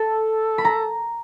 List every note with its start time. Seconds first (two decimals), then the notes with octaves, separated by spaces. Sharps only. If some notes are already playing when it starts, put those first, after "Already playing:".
Already playing: A4 A5
0.58 B5
0.65 A#5